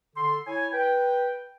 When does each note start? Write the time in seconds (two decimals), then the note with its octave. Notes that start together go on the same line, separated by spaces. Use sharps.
0.16 D3 A4 C6
0.47 E4 C#5 G#5
0.73 B4 G5